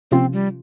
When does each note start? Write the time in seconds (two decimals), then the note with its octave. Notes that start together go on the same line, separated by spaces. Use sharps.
0.11 C3 F3 A#3 C4 C#4 F4
0.33 G3